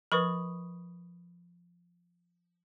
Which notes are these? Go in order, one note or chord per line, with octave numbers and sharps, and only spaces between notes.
F3 A#4 B4 B5 C#6 D#6